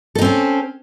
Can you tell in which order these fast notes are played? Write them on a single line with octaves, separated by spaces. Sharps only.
A4 D#4 C4 C#4